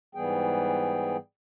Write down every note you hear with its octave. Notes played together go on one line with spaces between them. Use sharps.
G#2 E3 G3 B3 G#4 G5